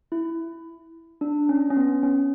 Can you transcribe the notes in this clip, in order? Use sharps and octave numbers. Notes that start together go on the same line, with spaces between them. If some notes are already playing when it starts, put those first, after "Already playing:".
E4
D4
C#4
C#4
B3
C#4